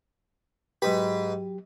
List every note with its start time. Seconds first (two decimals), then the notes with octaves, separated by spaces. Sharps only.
0.82 G#2 F#3 G4 B4